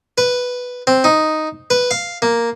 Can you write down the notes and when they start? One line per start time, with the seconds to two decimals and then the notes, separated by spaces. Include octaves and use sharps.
0.18 B4
0.87 C4
1.04 D#4
1.70 B4
1.91 F5
2.22 A#3